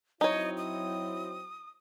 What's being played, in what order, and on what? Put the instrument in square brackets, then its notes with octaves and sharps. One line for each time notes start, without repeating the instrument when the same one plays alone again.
[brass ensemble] F#3 C4 E4 [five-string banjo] D#4 C#5 [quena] D#5
[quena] D#6